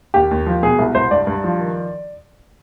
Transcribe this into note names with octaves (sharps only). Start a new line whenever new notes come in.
D#2 G4
D#2
F3
B2 G#4
C2
C2 C5
G2 D5
G2
F3
D#3